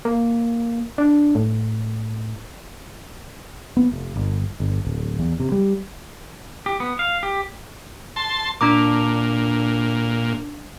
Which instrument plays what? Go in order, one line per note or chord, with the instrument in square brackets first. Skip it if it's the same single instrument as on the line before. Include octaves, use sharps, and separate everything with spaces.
[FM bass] A#3
D4
A2
[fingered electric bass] B3
F1
G1
G1
D1
E2
C3
G3
[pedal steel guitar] G4
B3
F5
G4
[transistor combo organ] A5 C6
[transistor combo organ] A#2 [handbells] D4 A#5 D6